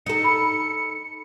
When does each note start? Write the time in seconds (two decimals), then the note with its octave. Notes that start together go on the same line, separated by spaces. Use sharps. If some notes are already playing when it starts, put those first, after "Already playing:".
0.06 D#4 A4 C#7
0.24 B5